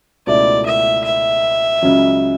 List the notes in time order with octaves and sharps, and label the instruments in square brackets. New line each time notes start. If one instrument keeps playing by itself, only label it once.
[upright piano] C#2 B2 A3 E4 [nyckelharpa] D5
[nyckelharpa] E5
E5
[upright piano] C#2 C#3 F#3 C#4